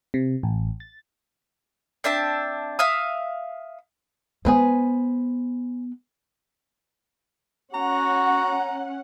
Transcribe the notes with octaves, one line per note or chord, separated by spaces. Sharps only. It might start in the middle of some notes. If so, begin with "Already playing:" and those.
C3
A1
A6
C4 D4 E5 A5
E5 F5 D#6
G#3 B3 G#4 B4 C5
C#4 F#4 F#5 A#5